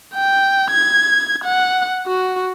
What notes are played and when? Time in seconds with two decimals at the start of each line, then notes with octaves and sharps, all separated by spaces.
0.15 G5
0.70 G#6
1.44 F#5
2.07 F#4